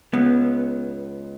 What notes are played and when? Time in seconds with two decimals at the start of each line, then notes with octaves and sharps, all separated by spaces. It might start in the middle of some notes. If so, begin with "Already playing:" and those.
0.14 C#2 B3